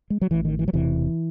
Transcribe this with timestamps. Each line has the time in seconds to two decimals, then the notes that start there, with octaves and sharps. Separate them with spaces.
0.10 G#3
0.21 F#3
0.31 A1 A2 E3
0.45 D#3
0.59 E3
0.68 F#3
0.73 E1 E2 C3 E3